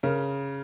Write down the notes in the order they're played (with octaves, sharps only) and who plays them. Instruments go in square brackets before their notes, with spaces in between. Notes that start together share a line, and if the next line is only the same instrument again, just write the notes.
[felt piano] C#3 A#4